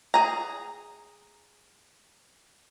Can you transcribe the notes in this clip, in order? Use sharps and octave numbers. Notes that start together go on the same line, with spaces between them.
G#4 A#5